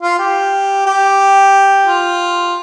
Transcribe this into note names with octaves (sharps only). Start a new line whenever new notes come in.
F4
G4
G4
F4